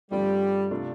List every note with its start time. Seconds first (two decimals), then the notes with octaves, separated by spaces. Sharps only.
0.11 G2 D3 F3 G3 A3 C4
0.71 C3 A3 D4 F4